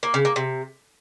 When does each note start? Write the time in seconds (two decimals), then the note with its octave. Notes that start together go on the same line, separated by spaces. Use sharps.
0.03 A#3
0.14 C#3
0.25 A#3
0.36 C3